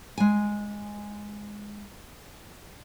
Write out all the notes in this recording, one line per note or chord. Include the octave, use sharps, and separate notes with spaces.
G#3 G#5